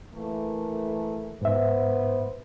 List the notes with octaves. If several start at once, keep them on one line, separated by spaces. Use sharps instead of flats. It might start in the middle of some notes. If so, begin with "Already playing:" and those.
E3 A3 A#3
G#2 B3 C5 E5